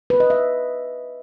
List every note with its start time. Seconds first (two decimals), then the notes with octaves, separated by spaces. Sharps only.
0.10 B4
0.20 D#5
0.30 E5